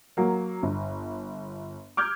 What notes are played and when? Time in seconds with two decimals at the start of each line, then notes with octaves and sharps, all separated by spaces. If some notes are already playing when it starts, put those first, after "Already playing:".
0.17 F#3 A#3
0.62 G1
1.97 D6 F6 G6 G#6